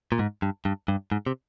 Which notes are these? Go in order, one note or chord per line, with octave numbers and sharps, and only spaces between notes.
A#2
G#2
G2
G2
G2
G#2
C3